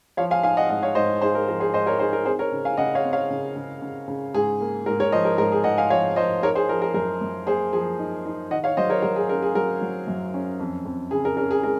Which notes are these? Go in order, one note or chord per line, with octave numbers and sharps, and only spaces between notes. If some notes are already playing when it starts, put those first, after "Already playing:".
F3 C#5 F5
F5 G#5
D#4 F5 G#5
D#5 F#5
G#2 D#5 F#5
C#5 F5
G#2 C5 D#5
D#4 G#4 C5
A#4
F3 A#4
G#4 C5
G#2 C5 D#5
A#4 C#5
D#4 G#4 C5
A#4
C4 G#4 C5
A#4 C#5
C#3
F5 G#5
C#3 D#5 F#5
C#5 F5
C4
C#5 F5
C#3
C#3
C#3
C#3
G#2 G#4
A#3
G#2 A#4
A#4 C#5
F3 C5 D#5
A#4
G#2 A#4
G#4
G#2 D#5 F#5
F5 G#5
F3 C#5 F5
F3 C5 D#5
D#4 A#4 C#5
G#4 C5
F3 A#4
A#4
F#2 A#4
F#2
A#3 G#4 C5
F3 G#4
D#4
D#4
D#3 D#5 F#5
C#5 F5
F#3 C5 D#5
A#4 C#5
F#3 A#4
G#4
C#4 A#4
G#4
F#3 A#4
F#3
F#2
C#4
F2
F2
C#3 G#4
A#4
C#4 A#4
G#4
G#3 A#4